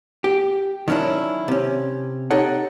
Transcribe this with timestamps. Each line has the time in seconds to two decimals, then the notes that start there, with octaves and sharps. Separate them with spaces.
0.24 G4
0.88 D#3 F#3 C#4 D4 E4
1.48 C3 C#4
2.31 D#4 G4 A4 C#5 F#5